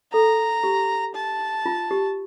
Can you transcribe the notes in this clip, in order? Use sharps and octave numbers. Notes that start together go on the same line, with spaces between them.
A4 A#5
G4
A5
F4
G4